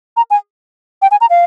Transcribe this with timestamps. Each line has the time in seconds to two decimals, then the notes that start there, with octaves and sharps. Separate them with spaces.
0.17 A#5
0.31 G#5
1.02 G5
1.11 G#5
1.21 A#5
1.30 F5